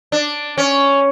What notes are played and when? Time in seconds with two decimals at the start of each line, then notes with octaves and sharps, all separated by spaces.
0.12 D4
0.58 C#4